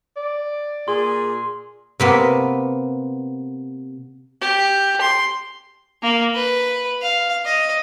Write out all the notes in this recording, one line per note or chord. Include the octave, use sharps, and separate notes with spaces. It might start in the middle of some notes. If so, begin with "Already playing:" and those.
D5
A#2 G#4 C6
C3 A#3 B3
G4
C6
A#3
B4
F5
D#5